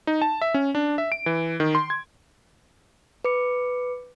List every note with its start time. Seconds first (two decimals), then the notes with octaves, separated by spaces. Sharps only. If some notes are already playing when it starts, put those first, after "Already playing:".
0.07 D#4
0.22 A5
0.41 E5
0.54 C#4
0.75 D4
0.98 E5
1.12 D7
1.26 E3
1.60 D#3
1.75 C6
1.90 G#6
3.25 B4 D6 C#7